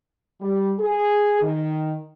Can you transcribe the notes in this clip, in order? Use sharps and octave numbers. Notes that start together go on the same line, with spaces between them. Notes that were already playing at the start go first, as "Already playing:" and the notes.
G3
G#4
D#3